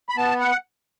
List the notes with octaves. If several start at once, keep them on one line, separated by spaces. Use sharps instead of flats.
B5
B3 A5
F#5